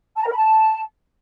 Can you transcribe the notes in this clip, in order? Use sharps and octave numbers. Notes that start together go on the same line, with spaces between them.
A5
A#5
A#4
B5
A5